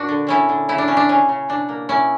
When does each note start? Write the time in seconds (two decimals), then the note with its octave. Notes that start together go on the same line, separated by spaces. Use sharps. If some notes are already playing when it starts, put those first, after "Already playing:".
Already playing: A#2 D4 F#4
0.09 D3
0.27 D3 C#4 E4
0.49 D3
0.69 C#3 E4
0.78 D4
0.88 C#3 C#4
0.97 D4
1.09 C#3 C#4
1.29 C#3
1.49 B2 D4
1.69 A#3
1.89 B2 C#4 E4